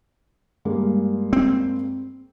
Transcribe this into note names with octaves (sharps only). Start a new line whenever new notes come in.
G2 G#3 A#3
C4